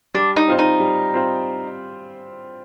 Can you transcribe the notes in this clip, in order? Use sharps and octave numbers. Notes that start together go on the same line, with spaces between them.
G3 D4
D#4
C4 F4 C5
D#4
G3
C4 F4 C5